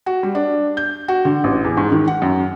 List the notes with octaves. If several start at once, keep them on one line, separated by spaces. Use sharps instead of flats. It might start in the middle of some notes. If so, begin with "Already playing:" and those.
F#4
G3
D4
G6
F#4
D3
A1
E2
G#2
D#3
F#5
F#2